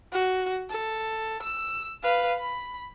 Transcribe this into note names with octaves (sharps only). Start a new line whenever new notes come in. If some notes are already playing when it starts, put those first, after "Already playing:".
F#4
A4
E6
B4 F5
B5